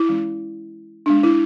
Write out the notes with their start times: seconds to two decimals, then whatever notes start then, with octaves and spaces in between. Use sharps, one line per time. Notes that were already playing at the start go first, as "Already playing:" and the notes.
Already playing: E4
0.09 E3 G#3 C#4
1.06 G#3 B3 D4
1.23 E4